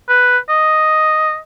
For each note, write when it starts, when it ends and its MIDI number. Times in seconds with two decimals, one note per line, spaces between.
0.09 0.38 71
0.49 1.37 75